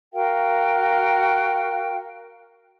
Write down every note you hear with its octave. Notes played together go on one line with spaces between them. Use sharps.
F#4 A#4 F5 G5